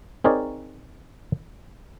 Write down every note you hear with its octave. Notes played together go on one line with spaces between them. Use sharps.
C4 D#4 G#4 A#4 C#5 D5